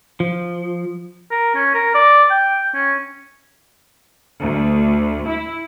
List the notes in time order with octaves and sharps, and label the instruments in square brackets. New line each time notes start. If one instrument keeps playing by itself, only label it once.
[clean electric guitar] F3
[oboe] A#4
C#4
A#4
D5
G5
C#4
[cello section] D2
E4